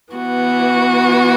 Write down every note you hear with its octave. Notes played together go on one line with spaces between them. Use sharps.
E3 B3 F#4